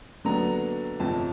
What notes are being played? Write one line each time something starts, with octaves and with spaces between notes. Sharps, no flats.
D#2 D3 F#3 B3 A#5
G1 F2 C3 F3 A5